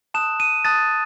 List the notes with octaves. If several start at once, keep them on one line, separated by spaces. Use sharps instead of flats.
A5 D#6 F#6 E7
D#7
A5 D#6 F#6 A6